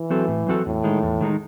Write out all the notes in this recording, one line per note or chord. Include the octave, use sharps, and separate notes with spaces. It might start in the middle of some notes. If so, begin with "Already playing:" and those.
Already playing: E3
F#3 C4 F#4 A4
A2
F#3 C4 F#4 A4
E2 A2
D#3 G#3 D#4
E2
D#3 G#3 D#4